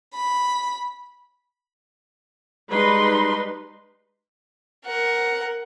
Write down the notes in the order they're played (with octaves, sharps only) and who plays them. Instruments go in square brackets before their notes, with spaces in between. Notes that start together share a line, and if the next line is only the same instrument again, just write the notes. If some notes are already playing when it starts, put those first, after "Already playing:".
[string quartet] B5
[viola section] G3 G#3 D#4 B4 B5 C6
[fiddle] A#4 F#5